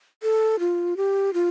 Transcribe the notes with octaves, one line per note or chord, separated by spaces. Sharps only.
A4
F4
G4
F4